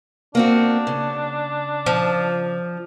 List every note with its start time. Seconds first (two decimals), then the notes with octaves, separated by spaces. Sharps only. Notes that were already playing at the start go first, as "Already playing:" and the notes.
0.35 A#3 C4 D4 F#4
0.87 C#3
1.86 F3